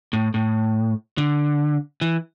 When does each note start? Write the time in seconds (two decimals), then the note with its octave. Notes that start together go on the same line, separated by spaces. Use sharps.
0.13 A2
0.34 A2
1.18 D3
2.01 E3